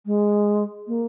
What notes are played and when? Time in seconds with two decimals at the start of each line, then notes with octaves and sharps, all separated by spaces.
0.06 G#3
0.87 A#3